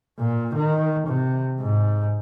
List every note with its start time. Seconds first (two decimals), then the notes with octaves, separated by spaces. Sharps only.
0.19 A#2
0.55 D#3
1.07 C3
1.61 G#2